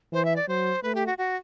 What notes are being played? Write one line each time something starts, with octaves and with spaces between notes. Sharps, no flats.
E3 C5
E5
D5
F#3 C5
A3 B4
G4
F#4
F#4